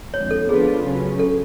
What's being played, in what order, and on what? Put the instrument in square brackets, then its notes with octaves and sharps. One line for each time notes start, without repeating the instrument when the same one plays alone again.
[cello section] F2 D3 G#3 [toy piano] C#5
[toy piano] A4
[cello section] F3 B3 D4 F4 B4 [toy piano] G#4
[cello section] C#3 F#3 C#4
[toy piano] A4